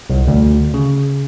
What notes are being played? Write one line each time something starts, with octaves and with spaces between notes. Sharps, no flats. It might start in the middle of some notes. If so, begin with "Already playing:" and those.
C2
D2
C#3